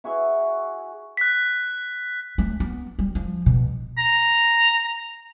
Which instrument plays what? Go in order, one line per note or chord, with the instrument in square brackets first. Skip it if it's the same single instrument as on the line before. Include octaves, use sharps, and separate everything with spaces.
[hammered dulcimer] E4 F#4 G#4 E5
[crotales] F#6 B6
[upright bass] A3
B3
G3
F3
B2
[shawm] A#5